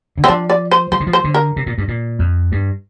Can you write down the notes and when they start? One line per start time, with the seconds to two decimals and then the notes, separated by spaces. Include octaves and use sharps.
0.18 D3
0.24 C4
0.28 F3 D4
0.50 D5
0.71 C5
0.92 F3 C5
1.00 D3
1.07 F3
1.13 C5
1.24 D3
1.34 A#4
1.56 C3
1.66 A#2
1.78 G2
1.88 A#2
2.19 F2
2.52 G2